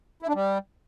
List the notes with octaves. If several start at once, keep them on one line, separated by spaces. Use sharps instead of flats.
E4
D4
G3